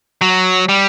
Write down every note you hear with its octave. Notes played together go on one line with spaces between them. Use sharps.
F#3
G3